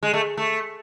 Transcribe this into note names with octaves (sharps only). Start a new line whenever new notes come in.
G#3
A3
A3